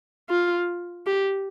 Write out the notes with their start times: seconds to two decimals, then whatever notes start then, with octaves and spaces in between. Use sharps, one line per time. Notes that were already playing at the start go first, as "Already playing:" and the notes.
0.29 F4
1.06 G4